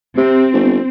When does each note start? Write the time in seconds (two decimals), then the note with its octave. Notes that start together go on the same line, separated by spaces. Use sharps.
0.17 C3 C4
0.53 G1